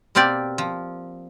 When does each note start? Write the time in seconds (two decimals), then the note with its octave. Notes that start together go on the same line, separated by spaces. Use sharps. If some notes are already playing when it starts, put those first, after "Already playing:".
0.15 B2 A#3 C4 G4 D5
0.58 F3